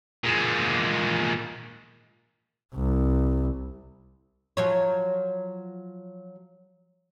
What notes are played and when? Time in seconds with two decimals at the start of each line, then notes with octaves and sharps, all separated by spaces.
0.24 A#2 G#3
2.75 C2
4.57 F3 F#3 C#5